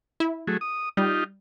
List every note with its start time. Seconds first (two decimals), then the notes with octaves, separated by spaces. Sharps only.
0.20 E4
0.47 F#3 A3 G#4
0.61 D#6
0.97 G3 D#4 F4 G4